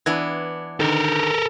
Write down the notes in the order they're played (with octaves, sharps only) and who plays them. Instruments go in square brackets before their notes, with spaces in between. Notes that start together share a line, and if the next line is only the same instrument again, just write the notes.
[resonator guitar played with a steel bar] E3 B3 D4 [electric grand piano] G#6
[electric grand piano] D3 D#3 [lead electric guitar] A4 A#4